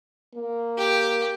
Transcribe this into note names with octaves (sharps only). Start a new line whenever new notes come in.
A#3
G4